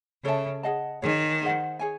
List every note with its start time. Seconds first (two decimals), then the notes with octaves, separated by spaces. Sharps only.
0.24 C#3 A4 C#5 E5 A5
0.63 G#4 D#5 F#5 A5
1.02 D#3 G#4 C#5 G#5
1.41 D#4 G#4 C5 F#5
1.79 G#4 C#5 G#5